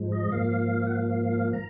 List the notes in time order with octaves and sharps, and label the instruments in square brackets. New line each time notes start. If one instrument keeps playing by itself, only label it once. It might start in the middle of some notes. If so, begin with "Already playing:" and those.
Already playing: [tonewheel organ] G#2 F3 G#3
D#5
G#2 F3 A#3 F5
F#5
F5
A#5